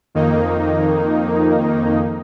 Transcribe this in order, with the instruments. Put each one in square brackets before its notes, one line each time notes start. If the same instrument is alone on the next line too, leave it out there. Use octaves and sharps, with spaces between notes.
[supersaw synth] F2 D#3 A#3 D#4